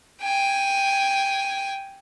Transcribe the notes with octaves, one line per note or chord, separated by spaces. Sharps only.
G5 G#5